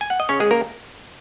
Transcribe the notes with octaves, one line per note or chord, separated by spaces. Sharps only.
G#5
F#5
D#5
C#3 C#4 C#5
G#3 G#4
C#3 A#3 A#4